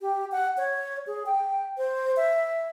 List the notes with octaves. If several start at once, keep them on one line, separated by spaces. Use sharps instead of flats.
G4
F#5
C#5
G#4
G5
C5
E5